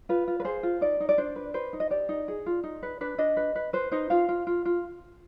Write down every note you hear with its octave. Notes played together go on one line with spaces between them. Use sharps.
F4 B4
F4
B4
G#4 C5
F4
D#4 D5
D#4
D5
D4 C5
B4
B4 C5
D#4
D#5
G4 D5
D#4
G#4
F4
D#4
B4
D4 B4
D4 D#5
B4
B4
B4 C5
D#4 C5
F4 F5
F4
F4
F4